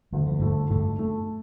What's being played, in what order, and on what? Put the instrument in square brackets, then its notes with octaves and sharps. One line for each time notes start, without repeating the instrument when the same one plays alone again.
[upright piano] D2 [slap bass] G3
[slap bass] F3
[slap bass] G2 G3 [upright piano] A3
[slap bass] G2 G3 [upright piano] A3
[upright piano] A3